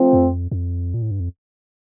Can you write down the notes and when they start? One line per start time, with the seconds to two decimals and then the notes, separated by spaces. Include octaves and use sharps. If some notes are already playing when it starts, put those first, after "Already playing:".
Already playing: F3 A3 C4
0.13 F2
0.51 F2
0.94 A#2
1.02 A2
1.11 G2
1.20 F2